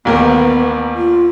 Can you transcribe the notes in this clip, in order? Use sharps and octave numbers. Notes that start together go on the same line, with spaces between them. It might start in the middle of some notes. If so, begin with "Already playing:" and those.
A1 D#2 B3 A#4
F4